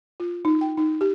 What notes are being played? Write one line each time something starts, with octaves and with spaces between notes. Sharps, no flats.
F4
D#4
G5
D#4
G4